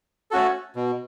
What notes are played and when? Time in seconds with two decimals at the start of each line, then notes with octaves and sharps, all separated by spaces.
0.31 A3 C#4 F#4 A4
0.76 B2